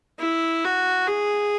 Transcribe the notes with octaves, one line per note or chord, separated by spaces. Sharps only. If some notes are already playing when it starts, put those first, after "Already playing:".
E4
F#4
G#4